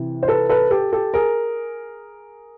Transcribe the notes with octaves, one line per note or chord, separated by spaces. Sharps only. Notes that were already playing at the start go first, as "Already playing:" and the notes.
Already playing: C3 E3
C5
A4 B4
A4 B4
G4 A4
G4 A4
G#4 A#4